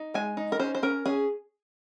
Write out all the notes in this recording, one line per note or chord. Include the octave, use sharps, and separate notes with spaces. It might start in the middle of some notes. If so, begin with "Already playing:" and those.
Already playing: D#4
G#3 G#5
D#4
A#4
C#4 C5
C5
C#4 A#4
C#4 G#4